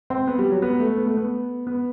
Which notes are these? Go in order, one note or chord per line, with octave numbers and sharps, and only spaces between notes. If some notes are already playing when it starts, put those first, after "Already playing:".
C4
B3
G3
F#3
B3
A3
B3
A3
B3
B3